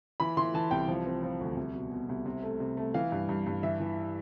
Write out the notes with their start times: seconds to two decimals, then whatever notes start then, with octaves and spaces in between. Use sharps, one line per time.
0.20 E3 B5
0.37 E3 C6
0.54 E3 A5
0.71 C2 G5
0.88 F3
1.06 C4
1.23 F3
1.41 D2
1.57 C2
1.75 B2
1.92 B2
2.09 C2
2.26 C3
2.43 A3
2.60 C3
2.77 A3
2.94 E3 F5
3.12 G2
3.29 G2
3.46 G2
3.63 E3 E5
3.80 E3